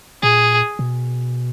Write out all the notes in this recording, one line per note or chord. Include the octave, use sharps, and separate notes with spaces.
A#2 G#4
B2